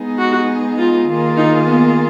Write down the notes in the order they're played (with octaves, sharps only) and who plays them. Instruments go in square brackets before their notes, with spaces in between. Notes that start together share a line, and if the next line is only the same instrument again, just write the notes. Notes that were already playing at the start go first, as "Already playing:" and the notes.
Already playing: [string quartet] G#3 B3 D#4 G#4
[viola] F#4
F4
[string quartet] D#3 A#3 F4 G#4
[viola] D#4
B3